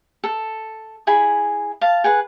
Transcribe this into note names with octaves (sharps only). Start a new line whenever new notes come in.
A4
E4 G#4 B5
F5 A5
G#4 B4 F#5